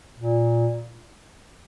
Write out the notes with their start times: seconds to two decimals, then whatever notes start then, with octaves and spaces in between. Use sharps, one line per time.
0.18 A#2